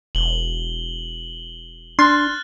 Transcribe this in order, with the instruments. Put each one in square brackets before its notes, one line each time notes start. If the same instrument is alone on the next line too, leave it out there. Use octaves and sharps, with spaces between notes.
[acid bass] E1 [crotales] F#7 G7
[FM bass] D4 [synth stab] C6 [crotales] F6 F#6 A6